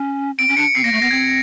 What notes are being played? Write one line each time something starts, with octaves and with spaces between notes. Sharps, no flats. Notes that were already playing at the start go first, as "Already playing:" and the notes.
Already playing: C#4
C4 D7
C#4
D4 C#7
C4 C7
A#3 A#6
A3
B3 A#6
C4 G#6